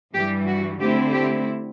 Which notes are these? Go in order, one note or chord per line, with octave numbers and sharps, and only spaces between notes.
G2 E3 G3 G4
F#4
D3 A3 C4 E4 G4
G4